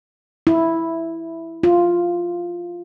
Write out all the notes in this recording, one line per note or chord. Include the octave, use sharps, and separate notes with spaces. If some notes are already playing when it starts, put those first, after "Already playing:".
E4
F4